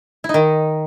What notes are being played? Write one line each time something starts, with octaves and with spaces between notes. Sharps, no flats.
E4
D#4
D#3